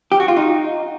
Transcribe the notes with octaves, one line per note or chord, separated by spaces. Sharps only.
G4
F#4
F4
D#4